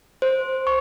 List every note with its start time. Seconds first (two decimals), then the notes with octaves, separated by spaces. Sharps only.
0.22 C5
0.67 C#6